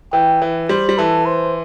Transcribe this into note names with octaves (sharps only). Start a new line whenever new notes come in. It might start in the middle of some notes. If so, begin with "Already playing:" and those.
E3 G5
E3
G3 C5
G3
E3 A4
C5